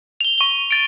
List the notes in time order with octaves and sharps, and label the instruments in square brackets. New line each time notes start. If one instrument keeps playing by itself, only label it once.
[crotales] F7 G7
C#6 G7
A6 D7